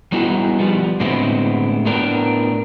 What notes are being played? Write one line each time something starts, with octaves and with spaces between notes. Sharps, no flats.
G3 B3 D#4 E4 F#4 G#4
F3 G3 B3
A2 D3 G#3 B3 C4 E4
A2 B3 D4 A#4 B4 G5